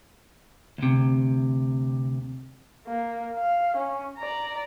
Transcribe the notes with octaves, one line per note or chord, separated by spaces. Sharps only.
D2 C3
A#3
F5
C#4
D5 A#5